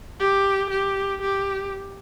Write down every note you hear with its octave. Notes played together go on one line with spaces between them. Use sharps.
G4
G4
G4